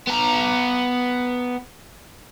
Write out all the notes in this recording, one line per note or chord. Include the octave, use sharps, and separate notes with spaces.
B3 A#5